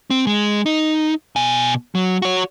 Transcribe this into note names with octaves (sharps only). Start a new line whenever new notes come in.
C4
G#3
D#4
B2 G#5
F#3
F#4 C#5